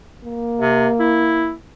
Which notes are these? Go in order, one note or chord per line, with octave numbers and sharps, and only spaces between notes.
A#3
C3
E4